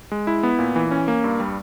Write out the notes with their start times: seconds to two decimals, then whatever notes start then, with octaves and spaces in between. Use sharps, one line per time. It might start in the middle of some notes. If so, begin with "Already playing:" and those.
0.12 G#3
0.27 E4
0.43 B3
0.59 A#2
0.76 E3
0.91 C#4
1.08 A#3
1.24 G2
1.40 G3